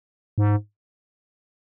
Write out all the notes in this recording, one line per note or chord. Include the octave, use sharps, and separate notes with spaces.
G#2